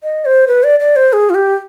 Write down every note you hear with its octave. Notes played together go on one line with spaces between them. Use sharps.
D#5
C5
B4
D5
D5
C5
G#4
F4
G4